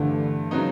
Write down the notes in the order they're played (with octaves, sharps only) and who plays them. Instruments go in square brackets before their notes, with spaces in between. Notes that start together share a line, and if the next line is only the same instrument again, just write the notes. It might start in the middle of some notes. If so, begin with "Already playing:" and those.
Already playing: [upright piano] G2 E3 A3 [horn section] D3
[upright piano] C#3 F#3 B3 D#4